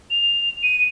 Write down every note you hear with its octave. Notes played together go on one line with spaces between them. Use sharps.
F7
D#7